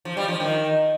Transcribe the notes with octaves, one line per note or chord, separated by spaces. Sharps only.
F3
G3
F3
D#3